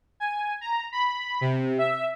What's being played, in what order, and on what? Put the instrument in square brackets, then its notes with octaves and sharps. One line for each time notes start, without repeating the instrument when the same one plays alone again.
[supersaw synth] G#5
A#5
B5
C3
E5